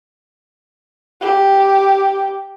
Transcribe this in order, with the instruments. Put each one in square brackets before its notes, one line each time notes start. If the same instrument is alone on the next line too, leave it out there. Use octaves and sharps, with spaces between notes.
[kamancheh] G4